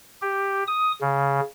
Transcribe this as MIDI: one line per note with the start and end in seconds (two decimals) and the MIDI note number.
0.22 0.64 67
0.67 0.92 87
1.01 1.40 49